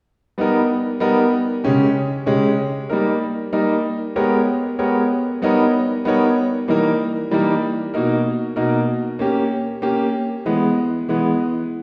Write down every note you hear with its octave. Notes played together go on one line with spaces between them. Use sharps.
G3 B3 D#4 A#4
G3 B3 D#4 A#4
C#3 G#3 C#4 G4
C#3 G#3 C#4 G4
G3 A#3 D#4 A#4
G3 A#3 D#4 A#4
G#3 B3 G4 A#4 C#5
G#3 B3 G4 A#4 C#5
G3 B3 D#4 A#4 C#5
G3 B3 D#4 A#4 C#5
E3 G3 A#3 D#4 A#4
E3 G3 A#3 D#4 A#4
B2 A#3 D#4 A#4
B2 A#3 D#4 A#4
A#3 C#4 G4
A#3 C#4 G4
E3 G#3 B3
E3 G#3 B3